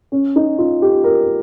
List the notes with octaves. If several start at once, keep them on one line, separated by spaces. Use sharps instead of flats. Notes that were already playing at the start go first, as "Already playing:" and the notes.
C#4
D#4
F4
G4
A#4